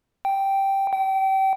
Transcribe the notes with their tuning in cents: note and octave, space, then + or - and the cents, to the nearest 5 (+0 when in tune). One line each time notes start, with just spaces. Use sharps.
G5 -5
G5 -30